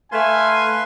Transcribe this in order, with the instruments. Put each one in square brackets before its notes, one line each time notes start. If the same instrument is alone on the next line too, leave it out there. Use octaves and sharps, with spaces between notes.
[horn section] A3 [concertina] B4 F5 C6 [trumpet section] G#5